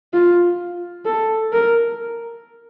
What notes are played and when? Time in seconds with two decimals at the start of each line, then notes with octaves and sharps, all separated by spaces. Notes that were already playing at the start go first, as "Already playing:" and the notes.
0.14 F4
1.06 A4
1.53 A#4